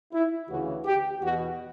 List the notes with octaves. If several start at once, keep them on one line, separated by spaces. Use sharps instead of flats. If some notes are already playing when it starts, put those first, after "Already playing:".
E4
D2 C#3 E3 F#4
G4
E2 B2 F#4